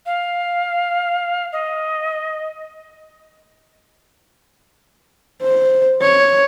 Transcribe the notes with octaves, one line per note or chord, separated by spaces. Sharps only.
F5
D#5
C5
C#5